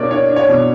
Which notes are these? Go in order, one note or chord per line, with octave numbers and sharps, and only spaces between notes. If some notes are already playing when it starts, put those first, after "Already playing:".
Already playing: B2 A#3 D4 C#5 D5
D4 C#5
D4
C#5
B2